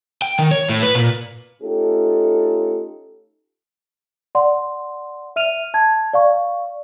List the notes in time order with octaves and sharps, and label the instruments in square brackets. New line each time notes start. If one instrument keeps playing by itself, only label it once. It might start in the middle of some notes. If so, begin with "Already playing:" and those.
[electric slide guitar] G5
D#3
C#5
A2
B4
A#2
[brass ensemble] A3 C#4 D#4 F4 G4 A4
[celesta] D5 F#5 C6
E5 F6 D#7 F7
A5 G#6
D5 F5 C#6